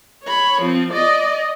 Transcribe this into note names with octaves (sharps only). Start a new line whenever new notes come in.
C#5 B5
F3 C4
D5 D#5